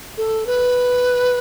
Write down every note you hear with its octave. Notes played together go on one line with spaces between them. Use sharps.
A4
B4